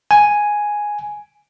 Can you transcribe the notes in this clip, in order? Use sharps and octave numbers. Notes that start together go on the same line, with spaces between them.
G#5